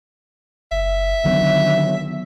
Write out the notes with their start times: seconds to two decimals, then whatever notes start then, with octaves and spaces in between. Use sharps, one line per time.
0.71 F#1 E5
1.25 D3 D#3 F#3 B3